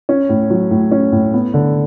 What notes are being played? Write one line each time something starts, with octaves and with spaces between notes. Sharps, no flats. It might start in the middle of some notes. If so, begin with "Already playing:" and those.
C#4
A2
F#3
A2
C#4
A2
B3
D3